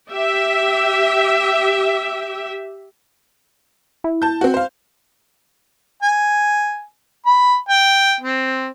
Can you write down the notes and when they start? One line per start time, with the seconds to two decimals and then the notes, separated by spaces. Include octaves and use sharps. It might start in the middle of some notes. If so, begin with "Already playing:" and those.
0.11 G4 E5
4.04 E4
4.22 A5 G6
4.41 C4 F#4
4.54 C5 F5
6.02 G#5
7.26 B5
7.69 G5
8.21 C4